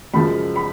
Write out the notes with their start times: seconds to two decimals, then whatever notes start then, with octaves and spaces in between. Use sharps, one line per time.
0.14 F#2 C#3 F3 G#3 B5
0.56 B5